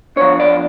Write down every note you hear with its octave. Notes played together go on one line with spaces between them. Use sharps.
F3 B3 D4 C#5
D5